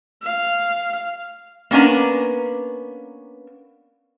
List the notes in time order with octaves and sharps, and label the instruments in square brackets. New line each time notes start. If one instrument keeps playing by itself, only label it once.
[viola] F5
[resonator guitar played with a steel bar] A#3 B3 C#4 D4 A#5